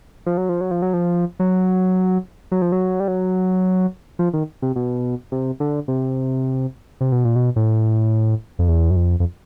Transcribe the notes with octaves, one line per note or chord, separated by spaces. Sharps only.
F3
F#3
F3
F#3
F3
F#3
F3
F#3
F#3
F3
F#3
G3
F#3
F3
D#3
C3
B2
C3
D3
C3
C3
B2
A#2
B2
A2
F2
E2
F#2
F2
F2